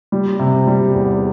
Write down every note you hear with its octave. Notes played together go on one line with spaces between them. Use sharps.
G3
C3
G3
E2